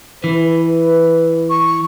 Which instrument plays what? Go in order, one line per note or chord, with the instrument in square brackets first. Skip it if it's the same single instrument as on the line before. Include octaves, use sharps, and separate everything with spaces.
[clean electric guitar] E3 [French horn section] B4
[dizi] C#6